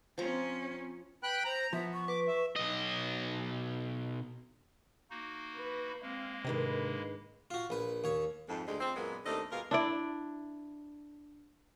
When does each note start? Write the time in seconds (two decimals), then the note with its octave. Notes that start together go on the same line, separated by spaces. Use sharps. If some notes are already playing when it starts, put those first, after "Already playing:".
0.18 F3 C4 C#4 A#5
1.23 B4 G5 B5 F#6
1.44 C5 A#5
1.73 F3 B3 E5
1.93 C#6
2.08 B4 D6
2.28 E5
2.56 B1 D#5
5.10 A#3 D#4 F#4
5.55 B4
6.02 G#3 A#3 C4 F5
6.45 G#2 C3 D#3 D4 B4
7.51 F4 F#4
7.70 A#1 B4
8.04 D#2 C#5
8.49 F2 G#2
8.67 D2 G3 G#3
8.80 F3 C4
8.96 F#2 A#2 G#3 A#3 B3
9.25 D#2 A3 C4 D4 A4 D#5
9.51 B2 G#3 A#3 F4 A#4
9.71 D4 E4 D5